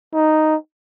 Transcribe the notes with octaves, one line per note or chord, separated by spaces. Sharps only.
D#4